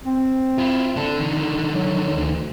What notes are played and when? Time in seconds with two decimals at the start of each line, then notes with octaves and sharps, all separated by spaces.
0.04 C4
0.58 E4 F4
0.96 D4 A4
1.20 D3 D#3
1.71 F#3
2.11 D2